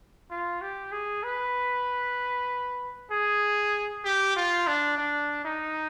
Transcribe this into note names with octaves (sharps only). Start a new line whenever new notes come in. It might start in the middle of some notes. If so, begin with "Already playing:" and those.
F4
G4
G#4
B4
G#4
G4
F4
D4
D4
D#4